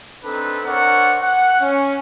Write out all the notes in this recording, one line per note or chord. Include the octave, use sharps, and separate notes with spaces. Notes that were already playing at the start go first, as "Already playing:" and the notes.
C4 D4 D#4 A4 B4
D4 A#4 C5 C#5 F#5
F#5
C#4